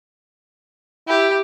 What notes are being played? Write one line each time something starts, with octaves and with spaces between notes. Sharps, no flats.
E4 G4